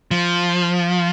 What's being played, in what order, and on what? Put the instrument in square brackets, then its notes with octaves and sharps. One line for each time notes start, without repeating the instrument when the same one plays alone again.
[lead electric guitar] F3